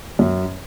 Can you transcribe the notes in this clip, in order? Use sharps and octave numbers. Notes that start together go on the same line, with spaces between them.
F#2